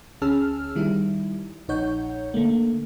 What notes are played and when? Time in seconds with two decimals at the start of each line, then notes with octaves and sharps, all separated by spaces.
0.22 D2 C#4 G#4 A5 E6 F6
0.76 D#3 G3 E4
1.69 A#1 D#4 C#5 F#5 G6
2.34 D3 A3 A#3